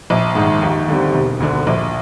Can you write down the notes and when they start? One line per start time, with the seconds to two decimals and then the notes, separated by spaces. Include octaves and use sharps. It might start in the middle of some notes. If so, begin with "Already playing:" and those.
0.10 A#1
0.35 G#2 D#3
0.62 D#2
0.88 D3 G3 C4
1.14 E1
1.40 D2 D3
1.67 A#1